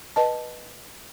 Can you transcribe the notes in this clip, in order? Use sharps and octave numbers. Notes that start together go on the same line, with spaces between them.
B4 D#5 A5